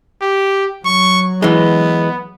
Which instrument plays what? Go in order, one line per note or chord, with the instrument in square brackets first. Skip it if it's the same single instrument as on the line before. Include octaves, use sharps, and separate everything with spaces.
[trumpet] G4
[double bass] F#3 [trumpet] C#6
[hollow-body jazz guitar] E3 G#3 [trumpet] B3